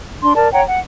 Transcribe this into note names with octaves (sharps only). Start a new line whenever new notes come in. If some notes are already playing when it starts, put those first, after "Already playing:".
D4 C6
A#4 D5 A5
C#5 F#5 G5 A#5
F#5